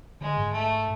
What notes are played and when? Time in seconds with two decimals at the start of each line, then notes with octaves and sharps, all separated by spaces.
0.21 D3 G#3
0.37 G#2
0.52 A3